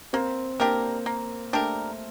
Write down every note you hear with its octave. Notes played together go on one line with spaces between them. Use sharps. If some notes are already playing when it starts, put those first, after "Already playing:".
A#3 C4
A#3 D4 G4 A#4
A#3
A3 D4 G4 A#4